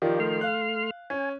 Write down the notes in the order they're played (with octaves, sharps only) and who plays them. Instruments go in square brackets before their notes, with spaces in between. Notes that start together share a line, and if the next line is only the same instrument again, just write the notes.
[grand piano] D#3 F3 [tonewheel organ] F4 G4 D5
[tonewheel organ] A3 C6 F6
[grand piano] F5 F#6
[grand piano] C#4 [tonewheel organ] G#5